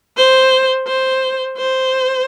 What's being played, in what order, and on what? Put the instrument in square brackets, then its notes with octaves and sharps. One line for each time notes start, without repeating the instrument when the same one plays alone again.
[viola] C5
C5
C5